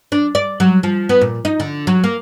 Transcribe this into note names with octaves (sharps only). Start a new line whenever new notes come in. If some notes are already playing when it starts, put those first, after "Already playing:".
D4
D5
F#3
F3
B3
A#2
D#4
D3
F#3
A#3